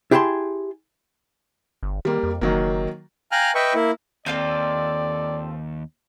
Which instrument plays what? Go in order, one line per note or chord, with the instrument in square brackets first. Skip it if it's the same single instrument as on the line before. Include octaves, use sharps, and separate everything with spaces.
[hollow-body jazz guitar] E4 G4 G#4 F#5 A5 C6
[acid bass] G1
[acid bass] D#3 [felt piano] G3 A#3
[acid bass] F2
[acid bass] F#1 [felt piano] D#3 F#3 A#3
[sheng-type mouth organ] F5 G5 G#5 A#5 F6 F#6
B4 D#5 E5 G5 C#6
A#3 E4
[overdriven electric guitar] D#2 [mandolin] C4 F4 A4 [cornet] D5